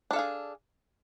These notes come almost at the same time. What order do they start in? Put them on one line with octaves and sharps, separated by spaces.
D4 A4 F5 G#4